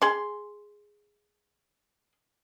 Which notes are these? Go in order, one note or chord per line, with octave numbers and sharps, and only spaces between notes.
G#4 C6